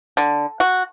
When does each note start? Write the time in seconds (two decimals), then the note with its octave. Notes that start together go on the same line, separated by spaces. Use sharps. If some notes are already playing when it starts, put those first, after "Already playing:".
0.17 D3
0.60 F#4